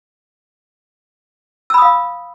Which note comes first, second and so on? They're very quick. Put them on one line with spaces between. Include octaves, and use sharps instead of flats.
E6 B5 D#6 F5